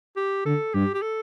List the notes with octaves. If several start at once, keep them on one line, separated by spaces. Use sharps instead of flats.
G4
D3 A4
G2 G4
G4
A4